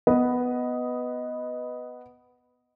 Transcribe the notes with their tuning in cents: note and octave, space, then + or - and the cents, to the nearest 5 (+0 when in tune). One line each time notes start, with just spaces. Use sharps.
B3 +5 B4 +0 D#5 +5